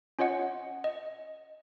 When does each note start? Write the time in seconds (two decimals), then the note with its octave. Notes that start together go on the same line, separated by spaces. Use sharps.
0.19 C#4 F4 C#5 D#5 F#5
0.84 D#5